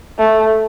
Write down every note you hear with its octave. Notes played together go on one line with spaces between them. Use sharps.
A3